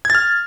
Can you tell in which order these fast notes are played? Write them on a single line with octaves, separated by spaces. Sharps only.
G#6 A6 F6